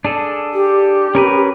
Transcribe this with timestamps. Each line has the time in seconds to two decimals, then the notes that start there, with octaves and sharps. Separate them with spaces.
0.05 D4 G#4 A4
0.54 G4
1.15 C#4 A#4 B4